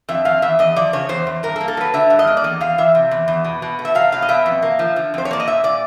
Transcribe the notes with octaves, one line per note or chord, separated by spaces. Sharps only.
F2 E5
F2 F5
E2 E5
E2 D#5
F3 D5
C#3 C#5
E2 C5
E2
G2 A#4
A4
A#3
A4
F#3 B4
D3 E5
G2
D#5
A#3
D5
E2 D#5
E2 F5
E3 E5
C3
E2
E2
B2
B2
A3
E5
F#3 F5
B2 F5
D#5
B2 E5
F2
A#3
F3
D3
F2 C5
C#5
A#3 D5
D#5
A#2 E5
A#2 D5